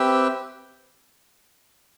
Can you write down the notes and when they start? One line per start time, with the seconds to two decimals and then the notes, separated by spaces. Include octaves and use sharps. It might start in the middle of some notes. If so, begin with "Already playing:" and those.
Already playing: C4 G4 B4 E5 G5